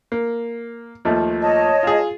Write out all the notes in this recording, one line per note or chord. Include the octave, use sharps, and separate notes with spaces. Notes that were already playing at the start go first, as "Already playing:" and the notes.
A#3
D#2 F3 A3
C#5 D#5 A5
F4 G#4